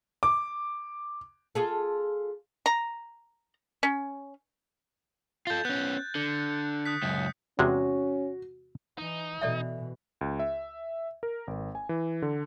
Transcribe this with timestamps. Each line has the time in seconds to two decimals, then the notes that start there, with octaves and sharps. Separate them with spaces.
0.23 D6
1.55 F4 G#4 A4
2.66 A#5
3.83 C#4
5.47 F4 A4 G6 A6
5.65 B3 C#4 F#6
6.15 D3 C#7
6.85 D#6 F#6 B6
7.02 C#2 F#2
7.59 E2 C3 G#3 C#4 F#4
8.98 E3 D#4
9.42 B2 E3 A4 D5 E5
10.21 C#2
10.39 E5
11.23 A#4
11.47 G#1
11.75 G#5
11.89 E3
12.22 D3